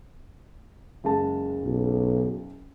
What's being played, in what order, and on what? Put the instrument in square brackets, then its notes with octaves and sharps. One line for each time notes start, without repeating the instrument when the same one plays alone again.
[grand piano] F#1 G#3 A5
[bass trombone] B1